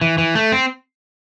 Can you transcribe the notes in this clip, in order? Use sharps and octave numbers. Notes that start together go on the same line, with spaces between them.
E3
E3
A3
C4